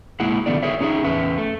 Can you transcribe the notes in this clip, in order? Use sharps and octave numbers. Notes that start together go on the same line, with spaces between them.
G#3 A#3 E4 G#4 F#5
D3 D#3 A3 B3 D4 D5
G#4 A#4 C#5 E5
C#4 D#4 G#4 D#5 E5
E2 C#4 B4 E5
A3